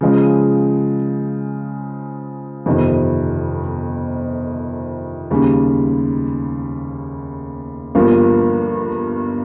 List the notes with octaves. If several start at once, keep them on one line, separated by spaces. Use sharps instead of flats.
C#3 F3 G#3
G1 F2 C3 D#3
D#2 C#3 G3
G1 G2 F3 A#3 F4